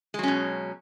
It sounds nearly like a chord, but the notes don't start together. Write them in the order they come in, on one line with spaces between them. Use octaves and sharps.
G#3 F#3 C#4 B2